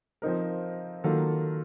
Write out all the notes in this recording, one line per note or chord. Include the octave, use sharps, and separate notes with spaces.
F3 C4 D#4 A#4
D#3 F#3 A#3 F4 A4